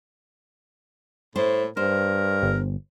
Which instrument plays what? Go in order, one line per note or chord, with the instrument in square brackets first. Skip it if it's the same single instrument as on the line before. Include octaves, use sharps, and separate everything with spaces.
[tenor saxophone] A2 [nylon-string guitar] A3 C5
[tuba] G2 [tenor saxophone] A#4 [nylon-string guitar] C5
[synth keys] G1